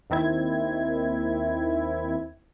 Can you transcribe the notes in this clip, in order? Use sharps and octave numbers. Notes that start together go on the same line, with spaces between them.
D#2 D#3 C4 E4 G#6